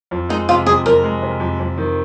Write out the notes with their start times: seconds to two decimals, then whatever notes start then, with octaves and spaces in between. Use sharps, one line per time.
0.11 F2
0.29 G#3 D#4
0.49 C3 F4
0.66 F2 G#4
0.86 F2 A#4
1.04 G#3
1.22 C3
1.40 F2
1.59 F2
1.78 D#3